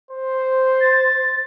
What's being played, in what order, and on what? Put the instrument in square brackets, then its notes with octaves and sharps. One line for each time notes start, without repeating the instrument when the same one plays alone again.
[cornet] C5
[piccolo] A6